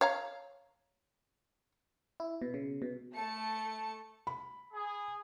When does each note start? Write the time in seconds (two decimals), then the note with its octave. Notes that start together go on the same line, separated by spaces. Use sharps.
0.01 C#5 F5 A#5
2.20 E4
2.42 B2
2.54 C#3
2.82 B2
3.15 A3 A5 C#7
4.27 B5
4.73 G#4